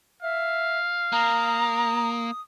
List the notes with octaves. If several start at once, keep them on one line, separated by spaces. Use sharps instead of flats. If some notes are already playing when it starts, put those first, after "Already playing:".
E5 F5
A#3 A#5 D#6